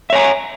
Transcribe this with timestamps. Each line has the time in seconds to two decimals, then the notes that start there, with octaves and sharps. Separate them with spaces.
0.10 E5
0.13 C#5
0.15 G#5
0.18 A#5